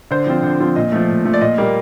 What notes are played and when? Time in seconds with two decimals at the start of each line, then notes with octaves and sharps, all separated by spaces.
0.11 D3 C5
0.27 F3 C4 F4
0.43 D3
0.60 F3 C4 F4
0.76 A#2 D#5
0.92 F3 A3
1.09 A#2
1.25 F3 A3
1.34 D5
1.41 A#2 D#5
1.58 G3 A#3